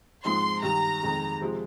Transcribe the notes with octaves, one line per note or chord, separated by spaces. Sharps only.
G#2 F3 G#3 C4 D#4 C6
G2 D#3 G3 A#5
F2 D#3 G#3
C3 F3 G#3